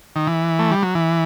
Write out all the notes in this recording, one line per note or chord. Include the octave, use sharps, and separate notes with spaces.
D#3
E3
A3
G3
F#3
E3